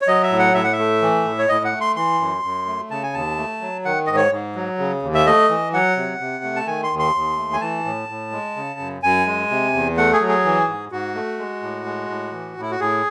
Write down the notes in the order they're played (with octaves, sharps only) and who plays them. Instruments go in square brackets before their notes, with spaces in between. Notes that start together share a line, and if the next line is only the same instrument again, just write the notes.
[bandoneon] C#5
F#3 D#5
E5
A2
F#5
A2 E5
F#5
E5
A3
E3
A2
C#5
A2 D#5
F#5
A3
C6
E3 C6
F#2
F#2
A3
C#3 A5
G#5
D#2 A5
A3
F#3
D#3 F#5
G#2 D#5
C#5
G#2
F#3
C#3
D#2
E5
A3 D#5
E3
F#3 F#5
C3
C3
A3
A5
D#3 G#5
C6
D#2
C6
D#2
A3
G#5
E3 A5
A2
A2
G#3
C#3
F#2
F#2 G#5
G#3
C3
E2
A3 F#5
G#4
F#3
G#4
E3
G#2
G#2 F#4
A3
G#3
A2
G#3
A2
E3
A2
E4
F#4
A2 G#4